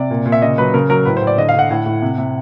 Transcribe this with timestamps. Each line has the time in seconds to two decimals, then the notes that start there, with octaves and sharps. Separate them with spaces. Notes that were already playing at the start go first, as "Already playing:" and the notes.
Already playing: C3 D5
0.10 A#2
0.26 A#2
0.32 E5
0.42 C#3 D#5
0.58 F#3 B4
0.74 C#3 A#4
0.90 F#3 A#4
1.06 A2 B4
1.17 C5
1.22 A2
1.27 D5
1.38 D3 D#5
1.49 F5
1.54 D3 F#5
1.70 A2
1.86 A2
2.02 C3
2.18 C3